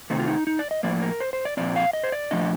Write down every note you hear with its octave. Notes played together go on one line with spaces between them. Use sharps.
C3 D#3 A3 C4 D#4
F4
D#4
D#4
D5
D#5
A2 F3 A#3 D5
A#4
C5
C5
D5
A#2 F3 C4 D5
F5
D#5
C5
D5
A#2 F3 A3 D4 D#5